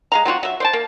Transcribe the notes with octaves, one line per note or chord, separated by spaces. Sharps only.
G#3 F5 A#5
F#3 C4 F4 F#4
F#3 E5
C5 D5 A5
A#3